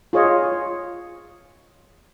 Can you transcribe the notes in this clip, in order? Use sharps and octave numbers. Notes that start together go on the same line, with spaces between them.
F4 G#4 C#5 D#5